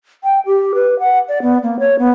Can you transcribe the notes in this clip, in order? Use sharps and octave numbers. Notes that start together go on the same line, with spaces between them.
G5
G4
B4
F#5
D5
B3
A#3
C#5
B3